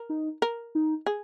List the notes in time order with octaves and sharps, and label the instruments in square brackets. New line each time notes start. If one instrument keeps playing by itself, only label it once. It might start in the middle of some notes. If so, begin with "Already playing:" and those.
Already playing: [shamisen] A#4
[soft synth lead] D#4
[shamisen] A#4
[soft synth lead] D#4
[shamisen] G#4